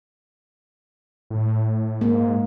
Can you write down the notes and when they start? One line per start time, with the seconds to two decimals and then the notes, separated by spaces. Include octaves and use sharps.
1.30 A2
2.01 G#2 A#3